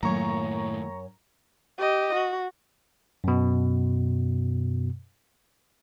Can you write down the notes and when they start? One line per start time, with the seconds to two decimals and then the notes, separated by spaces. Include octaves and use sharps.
0.03 F#2 A2 D#3 A3 A#3 C#5 A#5 C#6
1.79 G4 D#5
2.15 F#4
3.24 F#2 B2